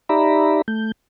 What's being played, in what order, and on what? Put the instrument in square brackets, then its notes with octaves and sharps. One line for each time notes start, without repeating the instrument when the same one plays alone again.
[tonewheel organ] D#4 G4 D5 E5 A#5 B5
A3 G6